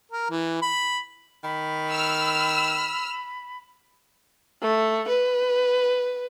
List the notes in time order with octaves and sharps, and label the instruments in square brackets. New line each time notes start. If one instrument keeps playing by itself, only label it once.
[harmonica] A#4
E3
B5
[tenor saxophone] D#3 [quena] B5
[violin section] E6 F6
[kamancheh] A3
B4